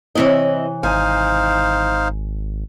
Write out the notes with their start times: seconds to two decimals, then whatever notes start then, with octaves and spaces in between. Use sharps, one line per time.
0.15 C3 E3 C4 E4 C#5 D#5
0.83 G#1 D#4 C5 F5 G#5